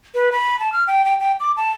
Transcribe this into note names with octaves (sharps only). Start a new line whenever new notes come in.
B4
B5
A5
F6
G5
G5
G5
D6
A5